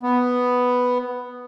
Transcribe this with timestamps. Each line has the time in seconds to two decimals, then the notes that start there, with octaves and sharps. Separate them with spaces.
0.03 B3